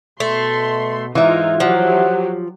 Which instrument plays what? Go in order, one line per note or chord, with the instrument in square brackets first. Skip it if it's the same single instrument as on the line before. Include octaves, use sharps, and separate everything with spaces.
[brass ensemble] B2 [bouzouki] A3 [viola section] C6
[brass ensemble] G#2 [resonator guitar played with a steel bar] E3 E5 [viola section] D#4 F4
[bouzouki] F3 [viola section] F#3 G4 [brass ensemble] F#5